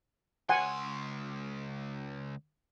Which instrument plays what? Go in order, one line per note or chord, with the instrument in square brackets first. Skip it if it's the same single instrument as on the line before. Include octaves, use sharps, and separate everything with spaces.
[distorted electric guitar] C#2 C6 [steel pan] F#5 G#5